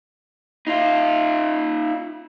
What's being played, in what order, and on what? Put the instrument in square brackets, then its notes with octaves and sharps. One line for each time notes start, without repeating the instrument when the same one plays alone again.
[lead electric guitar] D#4 F4